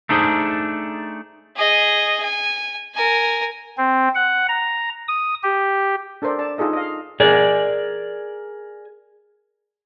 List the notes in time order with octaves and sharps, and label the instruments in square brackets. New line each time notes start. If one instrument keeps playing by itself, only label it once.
[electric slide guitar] A3 D4 D#4 G#4 C5
[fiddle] G#4 D#5
G#5
A#4 G#5
[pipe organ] C4
F#5
A#5
D#6
G4
[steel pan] D4 A4 A#4 C5 D5
D5 A5
D#4 F4 G#4 A4 D#5
D#5 F5
[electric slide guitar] G#4 A#4 D5